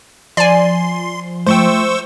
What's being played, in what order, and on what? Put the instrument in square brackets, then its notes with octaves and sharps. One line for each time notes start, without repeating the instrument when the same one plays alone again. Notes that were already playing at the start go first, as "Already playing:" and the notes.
[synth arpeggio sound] F3 [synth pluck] D5 G#5 [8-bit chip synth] C6
[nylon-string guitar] A3 F4 G5 [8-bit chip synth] C5 C#6 E6